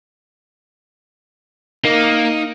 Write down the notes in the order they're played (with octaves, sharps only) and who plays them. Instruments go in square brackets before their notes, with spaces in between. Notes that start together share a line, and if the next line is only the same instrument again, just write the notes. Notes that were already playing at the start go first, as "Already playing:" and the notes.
[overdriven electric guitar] A#3 [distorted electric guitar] D#4